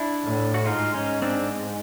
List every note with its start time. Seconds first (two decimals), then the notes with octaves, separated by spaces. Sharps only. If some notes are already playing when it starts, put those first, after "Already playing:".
Already playing: D4 E4
0.24 A2
0.54 F#4
0.66 G#2 D#4 F4
0.94 C#4 D#4
1.22 C4 D4